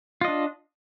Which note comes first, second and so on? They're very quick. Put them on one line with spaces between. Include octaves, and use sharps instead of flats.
F4 D#5 D4